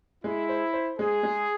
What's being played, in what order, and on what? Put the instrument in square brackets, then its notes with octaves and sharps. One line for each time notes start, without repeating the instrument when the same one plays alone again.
[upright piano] G#3 [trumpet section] E4
[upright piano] C5
C5
[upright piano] G#3 [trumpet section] G#4
[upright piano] G#3